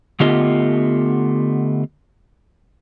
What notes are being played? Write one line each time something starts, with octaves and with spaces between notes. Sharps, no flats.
D3 A3 B3 F4 G4 D#5